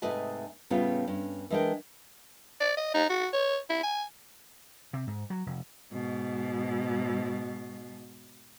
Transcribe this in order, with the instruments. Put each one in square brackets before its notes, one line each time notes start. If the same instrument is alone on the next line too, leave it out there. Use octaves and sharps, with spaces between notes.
[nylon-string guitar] G#2 C3 A3 B4 D#5 G#5
A2 C#3 G3 B3 C#4 F4
G2 C#4
E3 G#3 D4 A#4 G5
[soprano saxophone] D5
D#5
D#4
F#4
C#5
E4
G#5
[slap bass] C3
G#2
F#3
F1
[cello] G#2 B2